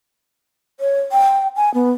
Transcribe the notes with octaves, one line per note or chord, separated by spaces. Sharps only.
C#5
G5
G#5
B3